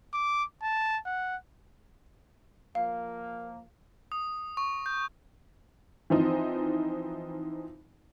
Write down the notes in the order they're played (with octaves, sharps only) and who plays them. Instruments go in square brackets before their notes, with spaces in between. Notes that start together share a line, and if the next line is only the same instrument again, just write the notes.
[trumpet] D6
A5
F#5
[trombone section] F3 A#3 [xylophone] F5
[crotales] D#6
C#6
G6
[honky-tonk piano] E3 F3 C4 D#4